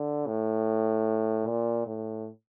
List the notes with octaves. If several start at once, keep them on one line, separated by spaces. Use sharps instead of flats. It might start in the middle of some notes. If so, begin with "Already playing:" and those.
Already playing: D3
A2
A#2
A2